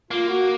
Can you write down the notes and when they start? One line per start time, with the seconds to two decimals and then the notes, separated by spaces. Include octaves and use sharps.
0.11 A#3 F4
0.29 F#4